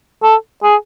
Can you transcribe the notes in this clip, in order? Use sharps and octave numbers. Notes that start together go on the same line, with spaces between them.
A4
G#4